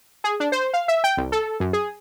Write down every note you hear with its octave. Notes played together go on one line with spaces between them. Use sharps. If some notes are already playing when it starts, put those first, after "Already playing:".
G#4
D4
C5
F5
E5
G5
C2
A4
F#2
G#4